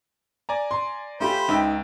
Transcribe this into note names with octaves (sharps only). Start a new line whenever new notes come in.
D5 G#5 A#5
C6
A3 F4 G4 C5 B5
C#2 D#4 E5 G5